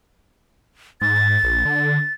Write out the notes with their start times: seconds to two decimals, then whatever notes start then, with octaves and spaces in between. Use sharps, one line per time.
1.01 G#2 A6
1.44 A#1
1.65 D3